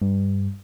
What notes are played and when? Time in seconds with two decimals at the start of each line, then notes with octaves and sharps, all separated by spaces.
0.02 G2